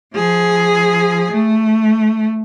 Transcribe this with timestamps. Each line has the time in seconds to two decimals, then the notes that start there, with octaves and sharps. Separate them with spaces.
0.14 F3 G#4
1.31 A3